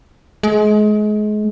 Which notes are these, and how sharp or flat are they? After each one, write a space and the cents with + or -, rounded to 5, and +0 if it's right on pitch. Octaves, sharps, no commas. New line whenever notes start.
G#3 +30